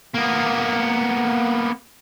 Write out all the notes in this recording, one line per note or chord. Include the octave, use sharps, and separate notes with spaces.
A#3 B3